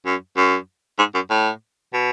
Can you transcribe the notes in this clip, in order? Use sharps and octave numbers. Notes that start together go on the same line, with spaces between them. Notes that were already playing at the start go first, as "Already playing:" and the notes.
F#2
F#2
G#2
F#2
A2
B2